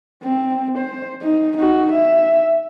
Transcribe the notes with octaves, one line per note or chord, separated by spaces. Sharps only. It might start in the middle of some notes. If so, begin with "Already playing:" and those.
C4
C5
D#4
D#4 F#4
E5